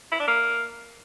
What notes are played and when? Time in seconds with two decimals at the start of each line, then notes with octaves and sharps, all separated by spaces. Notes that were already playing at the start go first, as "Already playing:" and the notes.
0.12 E4
0.20 D4
0.28 A#3